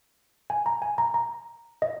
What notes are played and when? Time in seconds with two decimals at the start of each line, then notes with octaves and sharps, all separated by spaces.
0.50 G#5
0.66 A#5
0.82 G#5
0.98 A#5
1.14 A#5
1.82 D#5